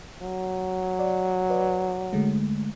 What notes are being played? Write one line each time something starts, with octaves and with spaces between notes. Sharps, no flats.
F#3
D5
B4 D5
D3 G#3 A3